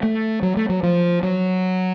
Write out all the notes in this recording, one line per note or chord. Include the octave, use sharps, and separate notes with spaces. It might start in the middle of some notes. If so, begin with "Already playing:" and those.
A3
F#3
A3
F#3
F3
F#3